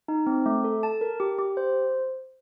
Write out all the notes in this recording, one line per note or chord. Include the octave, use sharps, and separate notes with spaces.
D#4
C4
A3
A4
A5
A#4
G4
G4
C5